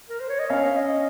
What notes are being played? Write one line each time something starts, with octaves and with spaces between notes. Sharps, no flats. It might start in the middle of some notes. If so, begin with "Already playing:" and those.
A#4
C5
C#5
D#5
C#4 F5
D#5